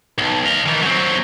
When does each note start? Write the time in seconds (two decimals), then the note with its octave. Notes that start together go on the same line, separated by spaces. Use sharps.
0.18 B1
0.46 D#5 F5
0.66 D#3 E3
0.82 F#3 C4